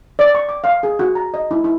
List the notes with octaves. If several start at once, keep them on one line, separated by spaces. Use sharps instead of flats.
D5
C#6
D6
F5
G#4
F#4
A#5
D#5
E4
E4